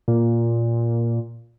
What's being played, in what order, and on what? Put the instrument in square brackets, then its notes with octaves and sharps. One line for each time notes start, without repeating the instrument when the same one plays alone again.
[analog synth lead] A#2